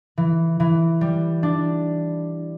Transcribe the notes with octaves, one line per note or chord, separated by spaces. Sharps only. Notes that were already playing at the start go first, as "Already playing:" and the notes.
E3
E3
G3
D4